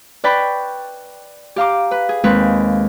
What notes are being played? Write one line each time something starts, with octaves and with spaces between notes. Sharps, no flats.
B4 D5 G5 B5 C#6
G4 F5 A#5 D6
B4
G#4
D#2 G#3 C4 B4